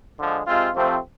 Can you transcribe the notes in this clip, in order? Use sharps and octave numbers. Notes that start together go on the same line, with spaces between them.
D3 F3 G#3
C3 G#3 C4 F4
C3 F3 A3 C4